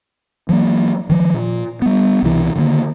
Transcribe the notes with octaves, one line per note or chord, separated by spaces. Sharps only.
E3 F#3 A3 A#3
D#3 F3
A#2
G3 B3
C2 B2 E3
D3 D#3 G#3 A#3